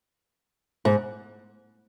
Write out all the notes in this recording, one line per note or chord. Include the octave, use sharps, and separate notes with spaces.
G#2